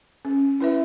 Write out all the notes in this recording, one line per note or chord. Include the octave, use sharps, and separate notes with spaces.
C#4
E4 B4 E5